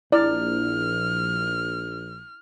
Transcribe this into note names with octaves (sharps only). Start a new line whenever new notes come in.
A#1 E4 D5 F6